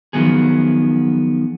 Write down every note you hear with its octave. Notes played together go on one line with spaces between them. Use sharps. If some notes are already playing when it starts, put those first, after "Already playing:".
D#3 F3 F#3 B3 G#4